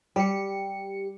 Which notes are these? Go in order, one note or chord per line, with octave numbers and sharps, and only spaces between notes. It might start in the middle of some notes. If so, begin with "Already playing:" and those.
G3 G4 C#7